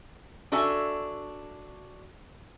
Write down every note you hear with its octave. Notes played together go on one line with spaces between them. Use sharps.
D4 F#4 A4 E5 G#5